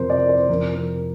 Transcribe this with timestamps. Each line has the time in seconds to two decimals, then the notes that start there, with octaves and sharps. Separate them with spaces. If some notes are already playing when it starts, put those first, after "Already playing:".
Already playing: F2 C3 F3 A#4 C5
0.10 D5
0.29 C5
0.49 F2 C3 F3 A#4
0.75 A#4